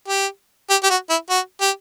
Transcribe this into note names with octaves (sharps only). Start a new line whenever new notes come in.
G4
G4
G4
F#4
E4
F#4
G4